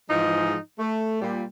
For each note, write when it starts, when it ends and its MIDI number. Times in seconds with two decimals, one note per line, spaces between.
0.09 0.56 44
0.09 0.56 52
0.09 0.56 53
0.09 0.56 56
0.09 0.56 63
0.79 1.19 57
1.22 1.44 46
1.22 1.44 55